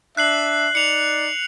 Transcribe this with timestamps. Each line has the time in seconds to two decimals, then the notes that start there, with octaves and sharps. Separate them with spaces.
0.17 D4 E5 F#6 C7 F#7
0.75 D#4 D5 C#7 F7